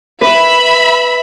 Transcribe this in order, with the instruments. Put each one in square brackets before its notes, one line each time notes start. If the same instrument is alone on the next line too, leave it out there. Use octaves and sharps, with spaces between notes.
[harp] B4 [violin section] E5 B5